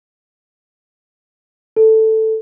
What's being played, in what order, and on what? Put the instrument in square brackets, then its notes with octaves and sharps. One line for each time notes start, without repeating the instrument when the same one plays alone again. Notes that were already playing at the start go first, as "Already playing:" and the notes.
[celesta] A4